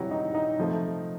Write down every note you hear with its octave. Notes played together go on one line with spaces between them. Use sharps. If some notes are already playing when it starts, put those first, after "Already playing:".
Already playing: C3 E3 F#3 G3 F#4 G4
D#4
D#4
C3 F3 A3